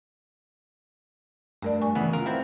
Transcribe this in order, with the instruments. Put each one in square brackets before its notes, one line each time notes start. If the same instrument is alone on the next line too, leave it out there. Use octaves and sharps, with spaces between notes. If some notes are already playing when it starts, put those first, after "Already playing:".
[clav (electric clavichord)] G2 [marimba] A3 A#4 D5
[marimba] G#5 C#6
[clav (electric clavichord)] C#3 E3 B3
F4 A#4
B3 C4 E4